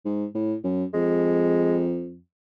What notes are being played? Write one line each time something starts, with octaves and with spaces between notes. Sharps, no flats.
G#2
A2
F#2
F2 G#3